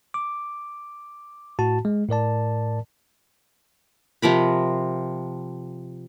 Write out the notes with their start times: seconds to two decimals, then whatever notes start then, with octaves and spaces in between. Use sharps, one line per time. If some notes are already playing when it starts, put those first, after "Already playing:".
0.14 D6
1.59 A2 F#4 A5
1.85 G#3
2.09 A2 A#4 D5 A5
4.22 C3 F3 A#4 B5